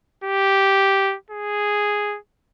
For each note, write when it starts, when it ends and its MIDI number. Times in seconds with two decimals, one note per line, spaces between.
0.24 1.16 67
1.31 2.18 68